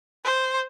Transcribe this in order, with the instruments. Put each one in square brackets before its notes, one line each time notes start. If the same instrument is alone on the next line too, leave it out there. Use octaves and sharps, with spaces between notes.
[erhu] C5